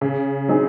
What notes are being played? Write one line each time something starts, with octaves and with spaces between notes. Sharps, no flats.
C#3
F#3 C4 D#4 G#4